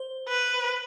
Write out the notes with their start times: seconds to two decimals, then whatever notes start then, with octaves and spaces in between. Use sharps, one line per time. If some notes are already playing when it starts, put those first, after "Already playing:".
Already playing: C5
0.28 B4